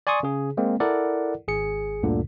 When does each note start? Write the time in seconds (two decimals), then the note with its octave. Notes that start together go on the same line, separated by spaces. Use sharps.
0.07 D5 G#5 C6 C#6 D#6
0.23 C#3 G#4
0.57 G#3 A#3 C4
0.80 E4 A4 A#4 D5 F#5
1.48 G#1 G#4 C#7
2.03 D2 G2 A#2 D3